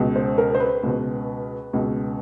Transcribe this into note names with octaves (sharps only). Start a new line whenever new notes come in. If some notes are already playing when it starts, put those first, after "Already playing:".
Already playing: C#2 B2
C5
A#4
C5
B4
C#2 B2
C#2 B2